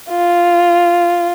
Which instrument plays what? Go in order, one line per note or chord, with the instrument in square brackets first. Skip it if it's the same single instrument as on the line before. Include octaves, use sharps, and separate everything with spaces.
[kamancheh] F4